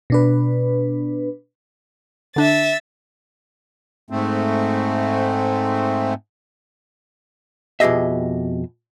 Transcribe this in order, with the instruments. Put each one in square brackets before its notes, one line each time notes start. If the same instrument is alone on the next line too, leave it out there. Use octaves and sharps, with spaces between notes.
[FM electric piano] B2 D4 B4
[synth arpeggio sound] D3 D4 [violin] E5 A6
[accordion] G#2 A3 C4
[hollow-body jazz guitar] F2 B2 G4 G#4 D#5 E5